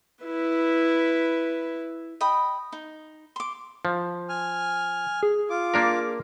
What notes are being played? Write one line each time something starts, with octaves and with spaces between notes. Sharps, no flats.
E4 B4
D#5 G5 B5 D#6
D#4
C6 D6
F3
G#5 F6
G#4
F4 D6
A#3 D4 A#4